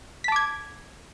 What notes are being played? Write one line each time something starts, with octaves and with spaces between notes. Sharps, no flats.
A5 D6 G#6 B6